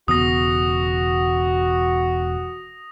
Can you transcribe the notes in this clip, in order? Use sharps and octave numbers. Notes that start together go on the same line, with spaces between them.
E1 C#3 B3 F#4 D#6 A#6